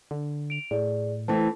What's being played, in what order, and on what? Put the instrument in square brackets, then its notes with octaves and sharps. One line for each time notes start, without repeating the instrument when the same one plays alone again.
[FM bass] D3
[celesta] D7 F7
[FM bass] A2 [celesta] G#4 D5
[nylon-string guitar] E3 A3 C4 [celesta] A5